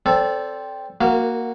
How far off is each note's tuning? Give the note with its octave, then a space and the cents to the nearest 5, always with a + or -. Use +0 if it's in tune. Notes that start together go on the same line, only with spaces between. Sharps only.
C4 +0 A4 +0 D5 -25
A#3 +0 F#4 +0 A#4 -35